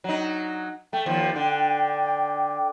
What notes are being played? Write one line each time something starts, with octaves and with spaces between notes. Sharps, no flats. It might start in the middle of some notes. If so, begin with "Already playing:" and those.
F#3 D#4
A3 G5
D#2 F3
D3